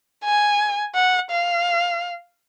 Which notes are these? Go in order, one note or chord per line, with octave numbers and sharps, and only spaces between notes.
G#5
F#5
F5